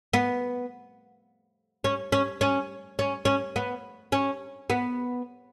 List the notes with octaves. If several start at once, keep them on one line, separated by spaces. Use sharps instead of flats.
B3
C#4
C#4
C#4
C#4
C#4
B3
C#4
B3